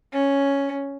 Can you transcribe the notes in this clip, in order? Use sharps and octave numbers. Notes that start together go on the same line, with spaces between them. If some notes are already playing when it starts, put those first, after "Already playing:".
C#4